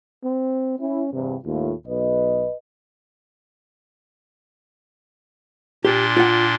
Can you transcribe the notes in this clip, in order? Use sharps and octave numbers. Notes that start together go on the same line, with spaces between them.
C4
C#4 E4
E2 G2 C3
D#2 A2 A3 F4
B1 B4 D#5
A#2 D4 G4 C6
F4 F#5